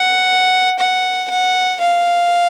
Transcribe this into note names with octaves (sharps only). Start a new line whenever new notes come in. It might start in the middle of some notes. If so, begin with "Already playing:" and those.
Already playing: F#5
F#5
F#5
F5